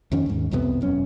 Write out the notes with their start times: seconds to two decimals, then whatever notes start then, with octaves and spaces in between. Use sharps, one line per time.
0.12 F2 D#3 C#4
0.26 D#2 G#2
0.51 C2 F2 C3 B3
0.81 E1 F#2 C#4